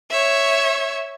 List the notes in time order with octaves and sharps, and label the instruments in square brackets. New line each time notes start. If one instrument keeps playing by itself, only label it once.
[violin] C#5 E5